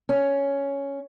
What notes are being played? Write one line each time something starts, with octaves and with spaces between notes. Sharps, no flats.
C#4